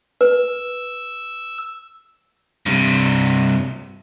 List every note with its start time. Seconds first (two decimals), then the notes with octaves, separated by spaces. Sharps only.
0.21 B4 E6
2.66 G2 C3